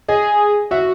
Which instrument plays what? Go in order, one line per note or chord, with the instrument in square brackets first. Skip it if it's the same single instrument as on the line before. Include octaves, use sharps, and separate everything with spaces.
[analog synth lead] G#4 [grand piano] D#5
[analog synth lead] F#4 [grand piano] E5